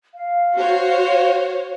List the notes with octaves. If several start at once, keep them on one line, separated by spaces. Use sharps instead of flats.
F5
F#4 C5 C#5